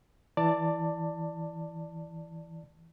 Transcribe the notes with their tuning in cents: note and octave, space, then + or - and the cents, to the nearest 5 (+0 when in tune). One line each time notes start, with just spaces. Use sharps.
E3 +0 D5 +0 A5 +20